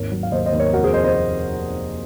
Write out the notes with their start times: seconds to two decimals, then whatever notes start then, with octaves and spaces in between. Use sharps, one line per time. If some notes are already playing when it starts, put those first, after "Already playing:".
Already playing: G#1 D#2 A#4 C#5
0.12 F#3
0.23 F5
0.32 D#2 C5 D#5
0.46 C5 D#5
0.53 D#2
0.60 A#4 C#5
0.73 F1 F#4 A#4
0.83 G#4 C5
0.94 F3 C5 D#5
1.04 C5 D#5